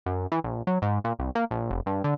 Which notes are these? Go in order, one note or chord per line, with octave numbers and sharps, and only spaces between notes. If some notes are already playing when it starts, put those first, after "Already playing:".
F#2
E3
A#1
F#3
G#2
A#2
C2
A#3
A#1
F1
G2
D3